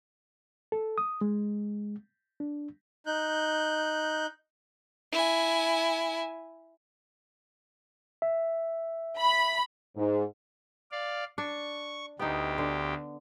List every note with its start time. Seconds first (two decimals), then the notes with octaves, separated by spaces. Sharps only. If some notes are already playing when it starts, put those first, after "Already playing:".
0.72 A4
0.98 D#6
1.21 G#3
2.40 D4
3.06 D#4 F#6 G6
5.12 E4 G#5
8.22 E5
9.19 B5
9.97 G#2
10.91 D5 F5
11.38 D4 C#6
12.19 D2 B3 D#4 G4
12.58 D3